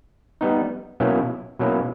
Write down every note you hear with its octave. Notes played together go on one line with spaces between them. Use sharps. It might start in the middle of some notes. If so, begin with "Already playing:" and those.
G3 B3 D#4
B2 F#3 A#3 C#4 E4
B2 F#3 A#3 C#4 E4